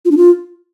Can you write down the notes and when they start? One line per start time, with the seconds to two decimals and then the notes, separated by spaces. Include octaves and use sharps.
0.05 F4
0.11 D4
0.17 F4